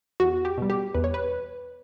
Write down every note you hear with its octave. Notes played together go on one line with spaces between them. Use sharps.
E2 F#4
G4
B2 G3
G4
E2 B4
C#5
B4